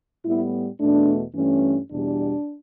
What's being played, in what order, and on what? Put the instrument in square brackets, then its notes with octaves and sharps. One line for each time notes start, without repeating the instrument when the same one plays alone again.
[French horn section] A2 G3 B3 E4
E2 B2 A3 D4
G2 E3 A3 C#4
E2 B2 G3 D4